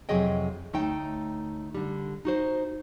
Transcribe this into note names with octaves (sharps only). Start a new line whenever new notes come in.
F2 C3 F#3 G#4 D#5 G5
D2 A3 D#4 C#5 G5
D3 G3
D#4 F#4 C5